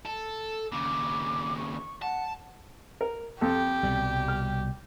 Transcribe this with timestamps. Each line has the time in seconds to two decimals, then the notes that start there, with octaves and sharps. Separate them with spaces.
0.06 A4
0.72 D#2 C#3 D6
1.57 C#6
2.02 F#5 A5
3.01 A#4
3.41 F2 G4 A4
3.83 C2 B2 G3
4.28 F6